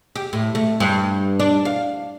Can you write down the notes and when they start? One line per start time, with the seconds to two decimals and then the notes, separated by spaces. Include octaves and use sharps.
0.16 G4
0.33 A2
0.55 A3
0.80 G2
1.39 D4
1.65 F5